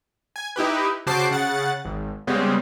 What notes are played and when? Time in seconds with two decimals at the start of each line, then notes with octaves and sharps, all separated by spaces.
0.36 G#5
0.56 D#4 E4 G4 B4
1.07 C#3 F#4 C5 A5 D6 C7
1.31 C#3 F#5 A6
1.85 G#1
2.27 C#3 G3 G#3 B3 C4